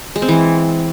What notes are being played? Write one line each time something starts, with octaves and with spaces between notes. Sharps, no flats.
G#3
C4
E3